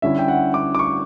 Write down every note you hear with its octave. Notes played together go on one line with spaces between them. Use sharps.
D3 G3 C#4 E4 E5
G5
F#5
D6
D6
C#6